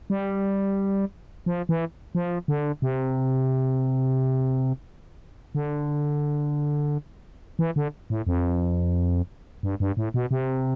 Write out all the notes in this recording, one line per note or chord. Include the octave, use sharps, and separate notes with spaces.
G3
F3
E3
F3
D3
C3
D3
E3
D3
A2
F2
G2
G2
A2
B2
C3